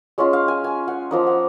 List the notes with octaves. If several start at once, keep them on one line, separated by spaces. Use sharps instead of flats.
G#3 C#4 F4
F5
G#5
G#5
F#5
F3 A#3 D#4
F#5